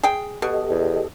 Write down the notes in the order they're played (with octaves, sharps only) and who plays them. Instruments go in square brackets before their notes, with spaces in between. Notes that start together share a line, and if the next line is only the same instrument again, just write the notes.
[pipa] G#4 G5
[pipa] B2 [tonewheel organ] G4 A4 D#5
[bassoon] E2